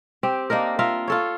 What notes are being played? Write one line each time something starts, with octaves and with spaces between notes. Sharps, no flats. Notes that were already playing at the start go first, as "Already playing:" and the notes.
C4 G4
A#3 D4 D#4 A#4
F4 A#4 E5 F5
F4 A4 C#5